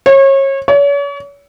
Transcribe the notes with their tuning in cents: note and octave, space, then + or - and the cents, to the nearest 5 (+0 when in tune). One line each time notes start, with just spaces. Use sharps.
C#5 -30
C#5 +40